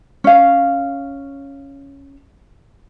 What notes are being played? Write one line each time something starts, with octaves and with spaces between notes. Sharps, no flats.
C#4 F5